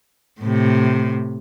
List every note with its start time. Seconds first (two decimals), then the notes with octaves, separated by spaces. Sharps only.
0.41 A2 C3